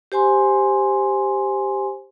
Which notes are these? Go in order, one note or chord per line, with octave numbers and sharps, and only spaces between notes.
G4 C5 G#5 C6